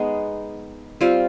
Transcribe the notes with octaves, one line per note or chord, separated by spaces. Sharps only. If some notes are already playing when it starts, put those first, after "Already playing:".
Already playing: G#3 B3 D#4
G3 C4 F4